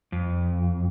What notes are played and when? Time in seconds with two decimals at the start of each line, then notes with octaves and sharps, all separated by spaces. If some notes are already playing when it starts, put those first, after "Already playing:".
0.12 F2